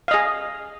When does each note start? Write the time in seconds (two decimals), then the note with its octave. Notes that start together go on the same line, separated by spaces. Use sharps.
0.08 F5
0.11 D#5
0.14 G#4